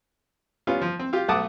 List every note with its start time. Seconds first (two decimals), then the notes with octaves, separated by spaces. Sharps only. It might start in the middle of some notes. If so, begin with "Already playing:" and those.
0.67 G3 B3 C#4 F4
0.82 F3
0.99 C4
1.13 F4 G4
1.28 B1 A3 F#5 A5 D6 D#6